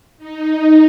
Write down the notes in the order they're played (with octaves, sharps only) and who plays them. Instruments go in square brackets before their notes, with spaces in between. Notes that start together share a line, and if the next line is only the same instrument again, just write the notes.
[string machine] D#4